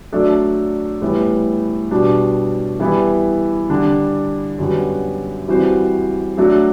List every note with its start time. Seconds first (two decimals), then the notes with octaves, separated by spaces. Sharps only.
0.12 F#3 A3 D4 A4 D5
1.01 A2 E3 G3 B3 E4
1.91 B2 G3 D4
2.80 E3 G3 B3 E4
3.70 D3 G3 D4
4.59 F#2 D3 G3 B3 F#4
5.48 E3 G3 C4 F#4 C5
6.37 F#3 A3 D4 F#4